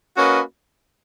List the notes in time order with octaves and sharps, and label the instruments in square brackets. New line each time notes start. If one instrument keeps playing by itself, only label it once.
[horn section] A#3 C#4 F#4 B4 D#5